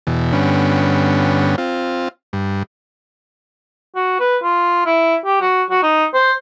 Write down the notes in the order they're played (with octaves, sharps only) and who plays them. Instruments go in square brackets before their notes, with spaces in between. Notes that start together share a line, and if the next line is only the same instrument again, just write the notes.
[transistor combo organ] E2 B2
G2 D3 B3 C#4
C4 F4
G2
[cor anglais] F#4
B4
F4
E4
G4
F#4
F#4
D#4
C5